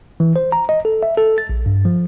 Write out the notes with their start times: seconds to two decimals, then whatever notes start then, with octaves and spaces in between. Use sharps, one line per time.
0.20 E3
0.36 C5
0.52 A#5
0.69 D#5
0.85 A4
1.03 E5
1.17 A4
1.38 A6
1.49 A#1
1.66 G2
1.85 F3